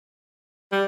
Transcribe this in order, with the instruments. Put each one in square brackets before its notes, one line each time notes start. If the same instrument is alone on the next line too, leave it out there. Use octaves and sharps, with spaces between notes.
[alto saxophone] G3